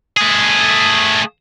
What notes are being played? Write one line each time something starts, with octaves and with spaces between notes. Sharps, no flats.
A3 G#4